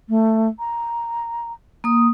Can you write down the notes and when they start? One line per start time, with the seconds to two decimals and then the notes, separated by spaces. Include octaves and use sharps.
0.09 A3
0.59 A#5
1.84 A#3 D#6